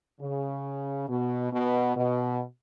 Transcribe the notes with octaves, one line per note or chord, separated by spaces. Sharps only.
C#3
B2
B2
B2